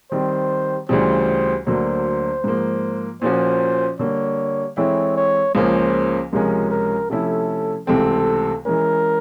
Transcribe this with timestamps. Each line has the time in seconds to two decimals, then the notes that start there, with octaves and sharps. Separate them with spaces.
0.11 D#3 G3 C4 C5
0.89 D2 C#3 E3 G3 C5
1.67 D2 D3 F#3 A#3 C5
2.44 G#2 F3 A#3
3.22 A#2 F3 A#3 C#4 F#4 C5
3.99 D3 G3 A#3 C#5
4.77 E3 G#3 C4 E4 A4 C#5
5.16 C#5
5.55 C#2 C#3 F3 A#3 C#4 C5
6.33 C#2 C3 F3 G#3 C#4 A#4
6.71 A#4
7.10 C3 F3 A3 C#4 E4 A4
7.87 C#2 C3 E3 A3 C4 A4
8.65 E3 G#3 C#4 A#4